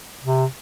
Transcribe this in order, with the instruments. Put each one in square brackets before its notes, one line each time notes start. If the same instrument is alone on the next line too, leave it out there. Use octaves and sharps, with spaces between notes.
[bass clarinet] C3